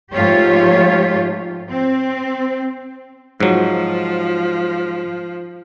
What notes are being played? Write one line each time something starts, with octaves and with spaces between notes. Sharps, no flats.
G#2 F3 A3 F4 G4 C#5
C4
G#2 F3 F#3